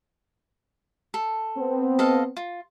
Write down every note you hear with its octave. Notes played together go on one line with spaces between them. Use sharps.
A4
B3 C4
A4 D#5 F5
F4